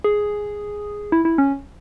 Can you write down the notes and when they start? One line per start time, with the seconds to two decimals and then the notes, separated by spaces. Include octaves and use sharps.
0.04 G#4
1.12 E4
1.25 E4
1.38 C#4